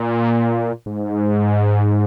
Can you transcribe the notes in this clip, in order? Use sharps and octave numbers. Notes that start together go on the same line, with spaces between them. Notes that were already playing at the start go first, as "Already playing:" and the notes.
Already playing: A#2
G#2